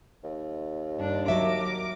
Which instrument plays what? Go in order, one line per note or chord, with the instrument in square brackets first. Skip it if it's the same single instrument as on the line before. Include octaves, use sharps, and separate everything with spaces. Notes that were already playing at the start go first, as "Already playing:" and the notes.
[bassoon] D#2
[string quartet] G2 D4
[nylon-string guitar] F#3 E5 [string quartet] A#4 D6